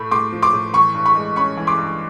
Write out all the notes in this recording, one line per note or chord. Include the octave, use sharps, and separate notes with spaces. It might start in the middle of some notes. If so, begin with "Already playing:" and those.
Already playing: A2 A3 B5
A2 C6 D6
F3
C6 D6
A2
E3 B5 C#6
G2
B5 C#6
G#3
C#4 B5 C#6
E3
C6 D6
G2